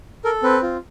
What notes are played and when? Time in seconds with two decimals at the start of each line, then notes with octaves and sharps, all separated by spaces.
0.25 A4 A#4
0.43 C4 B4
0.62 F4